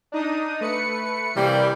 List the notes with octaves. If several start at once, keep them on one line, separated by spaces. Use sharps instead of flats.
D4 D#4 D#6
A3 B4 C#7
C3 E3 G3 A#3 C4